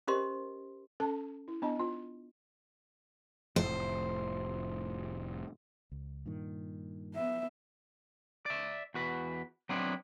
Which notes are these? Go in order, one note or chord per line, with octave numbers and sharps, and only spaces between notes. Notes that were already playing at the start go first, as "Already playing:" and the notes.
C#4 G4 A#4 C5 D#5 C6
C#4 A4 A5
E4
B3 D4 D#5 A5
F4
F1 A2 C5
C#2
G2 A#2 D#3
B3 E5
D5 E5
E2 F#4 B4
F#3 B3 C4 D4 E4